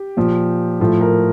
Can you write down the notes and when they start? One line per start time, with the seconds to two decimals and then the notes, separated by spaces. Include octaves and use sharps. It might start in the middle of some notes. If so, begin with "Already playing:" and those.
Already playing: G4
0.17 A#2 F3
0.80 A2 F3
1.01 A#4